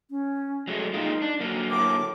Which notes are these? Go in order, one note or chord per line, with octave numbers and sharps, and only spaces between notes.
C#4
F#3 G#3 A3
G#3 A#3 D#4 F4
D4
D3 F#3 A#3
A2 D6